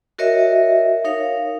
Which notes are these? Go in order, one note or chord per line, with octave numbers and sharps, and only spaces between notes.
F#4 A#4 C#5 D#5 E5
D#4 A#4 C#5 F5